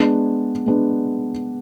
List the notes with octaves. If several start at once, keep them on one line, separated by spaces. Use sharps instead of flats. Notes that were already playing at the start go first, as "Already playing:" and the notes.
Already playing: G#3 B3 D4
G#3 B3 D4